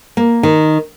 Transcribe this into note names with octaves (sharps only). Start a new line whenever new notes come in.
A#3
D#3